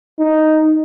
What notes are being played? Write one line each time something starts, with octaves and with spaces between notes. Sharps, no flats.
D#4